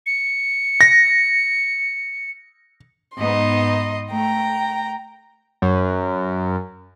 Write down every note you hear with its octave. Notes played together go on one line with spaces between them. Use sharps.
C#7
A#6
G#2 B3 D#4 D#5 C6
A3 G5 A#5
F#2